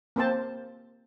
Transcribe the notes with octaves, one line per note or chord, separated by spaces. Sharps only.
A#3 C4 C5 A5